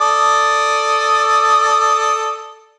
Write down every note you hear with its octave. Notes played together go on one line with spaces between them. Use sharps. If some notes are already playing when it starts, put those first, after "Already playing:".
A4 D5 D#6